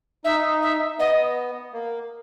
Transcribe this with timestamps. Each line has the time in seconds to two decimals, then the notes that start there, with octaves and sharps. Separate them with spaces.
0.25 D#4 E5
0.62 E5
0.99 B3 D#5
1.73 A#3